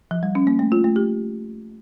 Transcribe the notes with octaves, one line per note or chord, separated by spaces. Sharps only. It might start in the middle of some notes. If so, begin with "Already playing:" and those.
F3
G3
C#4
A#3
A3
F4
A3
G4